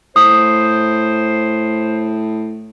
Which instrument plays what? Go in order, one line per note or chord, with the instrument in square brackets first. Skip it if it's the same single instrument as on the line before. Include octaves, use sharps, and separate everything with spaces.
[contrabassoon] A2 [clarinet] C5 [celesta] D#6